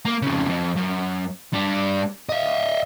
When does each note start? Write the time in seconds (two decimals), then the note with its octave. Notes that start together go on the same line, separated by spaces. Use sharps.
0.05 A#3
0.22 F2 C#3
0.49 F2
0.76 F#2
1.53 G3 D4
2.29 D#5 E5